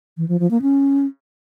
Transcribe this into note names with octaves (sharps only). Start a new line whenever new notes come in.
E3
F3
F3
A#3
C#4